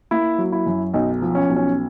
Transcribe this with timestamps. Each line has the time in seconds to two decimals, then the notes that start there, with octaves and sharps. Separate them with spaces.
0.11 A#3 E4
0.38 F#3
0.52 E4
0.66 F#2
0.94 B1 D#4
1.22 F3
1.35 C#4
1.49 B1
1.56 C#4